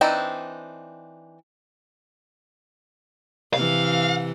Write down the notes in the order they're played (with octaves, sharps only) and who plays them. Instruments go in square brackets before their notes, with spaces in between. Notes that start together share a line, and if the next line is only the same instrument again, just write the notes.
[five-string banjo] E3 C4 D4 D#4
[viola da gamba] C3 E3 [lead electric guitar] F5